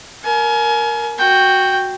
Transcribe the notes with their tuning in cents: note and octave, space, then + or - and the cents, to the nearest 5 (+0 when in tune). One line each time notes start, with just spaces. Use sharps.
A#4 +0 G#5 +35
F#4 +0 G5 +0